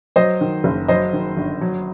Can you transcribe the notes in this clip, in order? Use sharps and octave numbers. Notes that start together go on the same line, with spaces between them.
F#3 C5 D#5
D#3
F#1
F#3 C5 D#5
D#3
G1
F#3